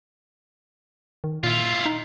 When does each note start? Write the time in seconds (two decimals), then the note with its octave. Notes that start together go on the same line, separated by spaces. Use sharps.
1.24 D#3
1.44 A#2 E4 F4
1.86 D#4